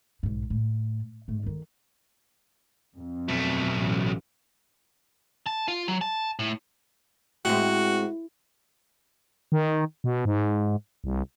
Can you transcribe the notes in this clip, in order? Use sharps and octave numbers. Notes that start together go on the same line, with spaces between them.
B1 G#2
A2
G#2 A3
D2 D#3
F2
B1 A3
A1
A5
F4
F#3
A5
A2
A2 G#3 C4 F#4 G4
D#3
B2
G#2
C2